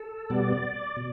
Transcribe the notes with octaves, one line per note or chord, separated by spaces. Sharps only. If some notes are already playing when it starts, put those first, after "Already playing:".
Already playing: A4
B2 G3 B3 D5
B2